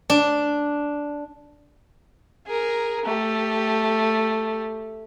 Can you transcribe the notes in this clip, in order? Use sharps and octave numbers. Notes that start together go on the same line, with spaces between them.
D4
G#4 A#4
A3 G4